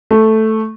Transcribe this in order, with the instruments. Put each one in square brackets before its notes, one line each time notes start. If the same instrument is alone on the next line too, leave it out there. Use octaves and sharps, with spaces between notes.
[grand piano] A3